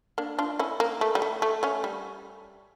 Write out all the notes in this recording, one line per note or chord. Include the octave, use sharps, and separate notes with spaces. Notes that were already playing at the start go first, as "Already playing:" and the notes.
A#3 D4
D4 F4
C#4 E4
A#3
A3
G3
A3
A3
A3 C#4
G3